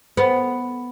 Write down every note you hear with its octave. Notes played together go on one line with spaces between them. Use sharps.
B3